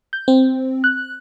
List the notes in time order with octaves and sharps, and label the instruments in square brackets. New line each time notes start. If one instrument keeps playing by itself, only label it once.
[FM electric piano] G6
C4
F#6